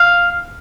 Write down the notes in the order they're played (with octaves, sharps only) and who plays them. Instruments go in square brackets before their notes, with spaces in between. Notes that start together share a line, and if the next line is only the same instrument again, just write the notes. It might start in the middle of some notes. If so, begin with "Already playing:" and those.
Already playing: [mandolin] F5